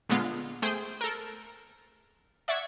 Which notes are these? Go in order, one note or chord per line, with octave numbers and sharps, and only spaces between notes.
A#2 D3 G#3 B3 F4
A3 G#4 C5 G5
A4 A#4
D5 E5 F#5 C#6 G#6 B6